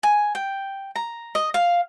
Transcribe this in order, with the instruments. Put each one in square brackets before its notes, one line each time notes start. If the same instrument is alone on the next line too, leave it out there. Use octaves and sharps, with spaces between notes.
[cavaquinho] G#5
G5
A#5
D#5
F5